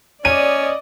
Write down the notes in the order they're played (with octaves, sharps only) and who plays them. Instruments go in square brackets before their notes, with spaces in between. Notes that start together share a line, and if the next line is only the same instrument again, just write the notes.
[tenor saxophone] C#4 [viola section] D5 D#5 [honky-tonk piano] D#7